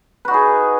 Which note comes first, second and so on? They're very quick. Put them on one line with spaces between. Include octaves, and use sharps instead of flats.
B4 F#4 D#4 G#4